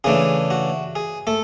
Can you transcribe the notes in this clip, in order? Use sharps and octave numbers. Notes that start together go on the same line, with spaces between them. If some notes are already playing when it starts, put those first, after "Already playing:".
C#3 E3 A3 D4 G#4
F#4
G#4
A3 A4